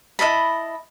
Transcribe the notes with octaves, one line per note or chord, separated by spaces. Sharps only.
E4 D#5 A5 B5